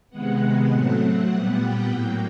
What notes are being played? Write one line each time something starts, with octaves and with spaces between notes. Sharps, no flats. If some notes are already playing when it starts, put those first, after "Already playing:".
C3 D#3 G#3 B3 F#5
A2 F#3 A3 C4
F#5
A#2 G3 B3
G5
A2 F#3 A#3